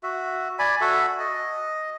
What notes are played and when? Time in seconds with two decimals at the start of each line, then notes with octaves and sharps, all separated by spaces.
0.03 F#4 E5
0.59 D5 G#5 B5
0.81 F#4 A4 E5
1.19 D#5